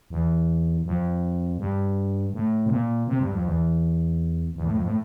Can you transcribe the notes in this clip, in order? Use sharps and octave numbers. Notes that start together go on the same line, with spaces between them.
E2
F2
G2
A2
C3
A#2
C3
G2
F2
E2
E2
A2
F2
A2